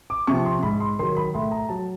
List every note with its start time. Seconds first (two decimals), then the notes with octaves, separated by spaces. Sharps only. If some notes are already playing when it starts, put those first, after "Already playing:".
0.10 D6
0.27 C3 F3 C#6
0.45 C6
0.63 G#2 B5
0.80 C6
0.99 D#3 F#3 C6
1.17 B5
1.34 A2 C6
1.51 A#5
1.69 F#3 A5